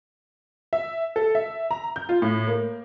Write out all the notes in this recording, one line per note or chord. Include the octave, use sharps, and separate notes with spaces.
E5
A4
E5
A#5
G6
F4
A2
A#3